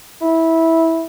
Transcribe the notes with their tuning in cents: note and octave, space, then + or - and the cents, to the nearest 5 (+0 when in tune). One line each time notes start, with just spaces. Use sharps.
E4 -15